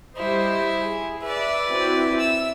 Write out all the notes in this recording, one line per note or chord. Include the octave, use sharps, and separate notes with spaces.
G3 E4 C5 D#5
G#4
B4 D5 E5
C4 E4 F#4
E5 E6